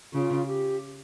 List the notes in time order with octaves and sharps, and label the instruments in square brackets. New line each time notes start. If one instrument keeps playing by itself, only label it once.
[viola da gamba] C#3 [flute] F4
[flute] G4